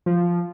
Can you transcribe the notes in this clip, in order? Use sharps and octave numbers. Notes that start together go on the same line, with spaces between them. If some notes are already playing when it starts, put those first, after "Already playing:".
F3